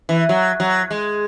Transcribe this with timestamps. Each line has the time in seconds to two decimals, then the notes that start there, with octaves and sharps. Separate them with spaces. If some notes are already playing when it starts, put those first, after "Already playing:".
0.09 E3
0.29 F#3
0.60 F#3
0.91 G#3